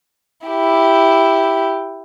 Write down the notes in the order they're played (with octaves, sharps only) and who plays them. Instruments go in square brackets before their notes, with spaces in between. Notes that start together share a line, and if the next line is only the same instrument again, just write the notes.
[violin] E4 G4